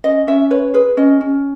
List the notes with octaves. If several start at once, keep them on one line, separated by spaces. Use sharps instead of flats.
C#4 D#5
C#4 E5
B4 C#5
G#4 B4
C#4 D#5
C#4